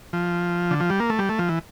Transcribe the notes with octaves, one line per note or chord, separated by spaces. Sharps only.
F3
D3
F3
G3
A#3
A3
G3
A3
F3
E3